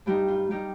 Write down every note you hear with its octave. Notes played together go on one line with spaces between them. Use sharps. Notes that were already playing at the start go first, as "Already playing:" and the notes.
G2 G3 D#4 G4
F4
G3 D#4 G4